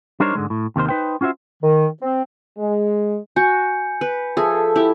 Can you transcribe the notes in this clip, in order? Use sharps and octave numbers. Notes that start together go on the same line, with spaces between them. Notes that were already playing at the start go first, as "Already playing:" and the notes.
G3 D4 D#4 A#4 C5 C#5
G#2 D3 G#3
A2
D#2 C3 D#3 C5
D#4 B4 C5 G5
C#4 F4 F#4 C5 E5
D#3
C4
G#3
F#4 G#5 G6 C#7
B4
F3 G#4 A4 E5
E4 G4